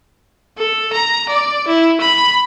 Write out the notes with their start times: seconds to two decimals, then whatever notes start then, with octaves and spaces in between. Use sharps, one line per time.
0.58 A4
0.93 A#5
1.29 D5
1.68 E4
2.01 B5